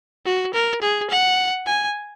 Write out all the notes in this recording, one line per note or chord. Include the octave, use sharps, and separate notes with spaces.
F#4
A#4
G#4
F#5
G#5